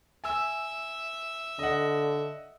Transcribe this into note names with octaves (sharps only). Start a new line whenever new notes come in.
E5 G#5 E6
D3 D#5 F#5